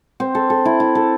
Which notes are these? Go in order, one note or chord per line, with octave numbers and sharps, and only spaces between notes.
C4
A4
A4
E4
E4
A4